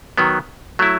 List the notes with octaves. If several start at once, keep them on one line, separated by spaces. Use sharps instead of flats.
D#3 F#3 B3
F#3 A3 E4